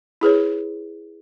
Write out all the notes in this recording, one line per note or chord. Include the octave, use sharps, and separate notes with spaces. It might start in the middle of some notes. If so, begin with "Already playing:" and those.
E4 G#4 B4 C#5